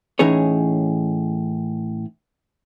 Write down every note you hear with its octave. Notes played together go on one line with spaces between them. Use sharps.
A2 E3 C#4 D#4 G#4 C#5